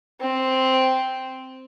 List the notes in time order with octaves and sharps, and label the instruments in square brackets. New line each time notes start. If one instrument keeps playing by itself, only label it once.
[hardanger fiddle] C4